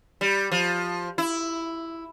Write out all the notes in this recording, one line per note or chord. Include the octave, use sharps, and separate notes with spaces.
G3
F3
E4